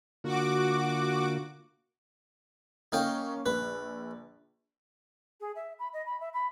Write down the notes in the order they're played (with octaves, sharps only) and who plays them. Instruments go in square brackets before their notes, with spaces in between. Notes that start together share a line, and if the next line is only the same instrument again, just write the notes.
[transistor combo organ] D3 A#3 F4 [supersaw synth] F#4 D6
[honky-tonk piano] A#3 C#4 [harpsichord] D#4 F5 G5
[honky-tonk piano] A#1 [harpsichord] B4
[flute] G#4
E5
B5
D#5
B5
E5
B5